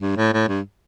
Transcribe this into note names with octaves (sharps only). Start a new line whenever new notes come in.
G2
A2
A2
G2